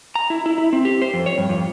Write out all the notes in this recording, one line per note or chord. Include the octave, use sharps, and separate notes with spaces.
A#5
E4
E4
E4
C4
G4
C5
F2
C#5
G2
F2